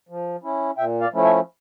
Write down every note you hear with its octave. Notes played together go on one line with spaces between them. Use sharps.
F3
C#4 E4
A#2 E5 G5
D5 F5
F3 A3 C#4 E4
C#5 E5